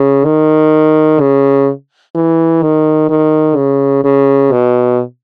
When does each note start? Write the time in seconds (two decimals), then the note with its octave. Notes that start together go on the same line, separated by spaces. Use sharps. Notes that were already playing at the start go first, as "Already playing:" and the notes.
Already playing: C#3
0.25 D#3
1.20 C#3
2.15 E3
2.62 D#3
3.10 D#3
3.56 C#3
4.04 C#3
4.52 B2